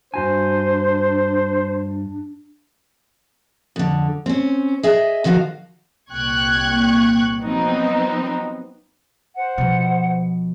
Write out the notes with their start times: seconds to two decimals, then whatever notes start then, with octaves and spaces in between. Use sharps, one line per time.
0.14 G2 D4 F#4 C5 G#5
3.76 F2 D3
4.26 C4 C#4
4.83 G#4 D#5 E5 G#5
5.24 D2 D#3 F3 F#4 F5
6.11 C2 A#2 G5 C#6 F#6 G#6
7.41 F3 F#3 B3 C4 D#4
9.36 C5 F#5
9.58 B2 F3